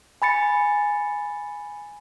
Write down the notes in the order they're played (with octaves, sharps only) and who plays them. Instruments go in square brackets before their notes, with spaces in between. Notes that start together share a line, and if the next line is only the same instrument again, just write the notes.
[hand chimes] G#5 B5 A6 C#7